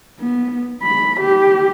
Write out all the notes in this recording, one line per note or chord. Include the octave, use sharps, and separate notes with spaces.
B3
B5
G4